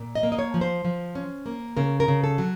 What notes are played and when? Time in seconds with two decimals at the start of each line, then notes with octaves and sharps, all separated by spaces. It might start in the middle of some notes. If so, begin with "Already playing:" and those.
Already playing: A#2
0.15 D#5
0.23 A#3
0.32 D#5
0.39 C#5
0.54 F3
0.61 C5
0.85 F3
1.15 C#4
1.46 A#3
1.77 C#3 A#4
2.00 A#4
2.08 C#3
2.24 A4
2.38 F#3